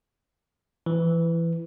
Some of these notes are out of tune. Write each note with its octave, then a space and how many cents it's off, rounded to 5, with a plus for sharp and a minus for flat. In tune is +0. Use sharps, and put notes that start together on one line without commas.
E3 +20